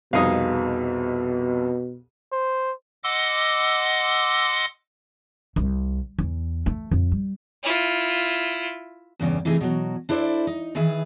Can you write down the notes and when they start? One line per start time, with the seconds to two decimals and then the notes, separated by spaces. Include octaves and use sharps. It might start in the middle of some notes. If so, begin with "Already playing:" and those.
0.13 C2 F2 B2 D#4 G#4 F5
2.32 C5
3.04 D#5 F#5 C6 D6 E6
5.56 C2
6.19 E2
6.66 A3
6.91 F2
7.12 G3
7.63 E4 F4
9.20 E2 G2 C#3 G3
9.45 C3 E3 A3 D#4 G#4
9.61 B2 F#3
10.09 D4 E4 A4 C5 D5
10.47 D#4
10.75 D#3 E3 G#4 B4 E5